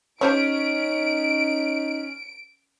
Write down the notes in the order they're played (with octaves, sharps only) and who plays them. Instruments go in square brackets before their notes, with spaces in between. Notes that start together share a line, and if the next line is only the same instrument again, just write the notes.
[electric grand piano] C#4 [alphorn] D#4 [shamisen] G4 C5 C#5 [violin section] D7